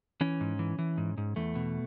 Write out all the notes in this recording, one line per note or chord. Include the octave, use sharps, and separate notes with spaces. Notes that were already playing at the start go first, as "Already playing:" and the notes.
E3 C#4
G#2
E3
E3
G#2
G#2
E2 A3
B2